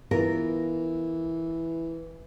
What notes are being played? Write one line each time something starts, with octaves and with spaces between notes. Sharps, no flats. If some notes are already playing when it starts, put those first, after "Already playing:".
E3 B3 F4 A#4